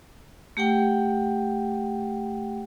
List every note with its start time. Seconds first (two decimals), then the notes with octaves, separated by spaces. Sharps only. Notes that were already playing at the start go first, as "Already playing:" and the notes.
0.57 A3 G4 F#5 G5